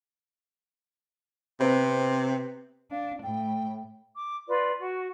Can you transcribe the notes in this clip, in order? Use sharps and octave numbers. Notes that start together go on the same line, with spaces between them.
C3 B3 C4 B4
D4 F5
A2 G5
D6
F4 B4 D5
F#4